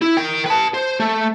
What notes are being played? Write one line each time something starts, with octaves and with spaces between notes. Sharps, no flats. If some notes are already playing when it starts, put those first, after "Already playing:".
E4
A#4 G5
B4 A5
C5
A3